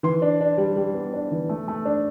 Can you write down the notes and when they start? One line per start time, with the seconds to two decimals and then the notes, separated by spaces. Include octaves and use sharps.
0.03 E3 C6
0.22 D4
0.41 D4
0.58 G3
0.76 G3
0.94 B3
1.13 D4
1.31 E3
1.49 A3
1.68 A3
1.85 D4